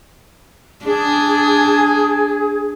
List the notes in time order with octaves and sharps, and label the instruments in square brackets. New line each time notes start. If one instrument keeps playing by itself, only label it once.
[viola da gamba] D4 [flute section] G#4